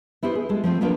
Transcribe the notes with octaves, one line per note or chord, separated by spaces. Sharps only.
B3 E4 G4 C5
G#4
G#3 A4
F3 A3 C4 F4
A#3 B3 D4 F4 A#4 B4